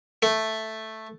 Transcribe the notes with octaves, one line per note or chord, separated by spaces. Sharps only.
A3